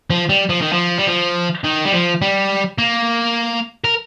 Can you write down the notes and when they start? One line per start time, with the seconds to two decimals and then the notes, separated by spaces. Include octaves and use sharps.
0.10 F3
0.29 G3
0.49 F3
0.61 D#3
0.72 F3
0.98 G3
1.07 F3
1.64 D#3
1.85 G3
1.92 F3
2.22 G3
2.78 A#3
3.84 A#4